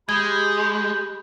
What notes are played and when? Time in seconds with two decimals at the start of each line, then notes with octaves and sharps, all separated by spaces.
0.09 G#3 G4 B5 G6 G#6